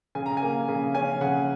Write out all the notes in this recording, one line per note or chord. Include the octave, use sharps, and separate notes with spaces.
C#3 G#5
A#5
A#3 G#5
C#3
C#4 G#5
C#3 F#5